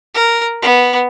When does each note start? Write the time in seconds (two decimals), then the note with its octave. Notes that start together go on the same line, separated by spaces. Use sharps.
0.15 A#4
0.62 B3